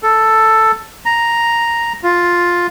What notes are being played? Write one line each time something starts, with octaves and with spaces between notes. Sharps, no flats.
A4
A#5
F4